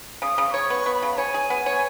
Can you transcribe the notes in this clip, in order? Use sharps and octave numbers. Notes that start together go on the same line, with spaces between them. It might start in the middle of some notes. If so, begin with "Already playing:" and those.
C#3 D#6
C#3
D#6
C#5 C#6
B3 C#6
B3
B5
C#3
C#5 G#5
G#4
B3
C#5